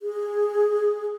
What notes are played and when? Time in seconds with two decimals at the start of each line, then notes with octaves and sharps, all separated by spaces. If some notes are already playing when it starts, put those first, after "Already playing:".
0.02 G#4